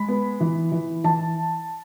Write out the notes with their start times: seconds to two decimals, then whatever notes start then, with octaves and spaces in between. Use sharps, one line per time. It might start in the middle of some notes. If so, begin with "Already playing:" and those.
Already playing: G#3 B5
0.08 B3
0.40 E3
0.72 E3
1.04 E3 A5